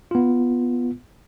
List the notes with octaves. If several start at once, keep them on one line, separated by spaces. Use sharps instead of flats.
B3 F4